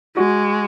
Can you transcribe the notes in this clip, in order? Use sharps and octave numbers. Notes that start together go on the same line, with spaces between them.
G#3 F#4